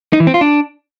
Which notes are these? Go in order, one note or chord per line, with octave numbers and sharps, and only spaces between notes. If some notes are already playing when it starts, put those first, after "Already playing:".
D#4
E3
C4
F4
D4